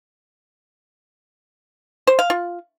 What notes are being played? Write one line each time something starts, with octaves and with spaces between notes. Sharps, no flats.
C5
F5
F4